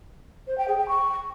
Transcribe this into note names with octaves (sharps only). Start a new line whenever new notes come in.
C5
G5
G#4
G5
C#6